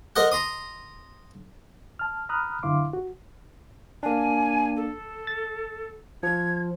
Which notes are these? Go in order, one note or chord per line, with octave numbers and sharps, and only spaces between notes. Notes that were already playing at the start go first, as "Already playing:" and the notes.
A#4 C5 D#5 F#5
A#5 C6 D#6
A5 F6
A#5 B5 D#6 F6 F#6
F#2 D3 E4 F5 C6 D6
F#4
A#3 D4 G#5
A4
A6
F3 G#6